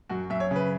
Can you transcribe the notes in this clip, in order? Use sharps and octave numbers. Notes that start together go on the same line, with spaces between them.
F#2 F#4
F#2 E5
C#5
C#3 B4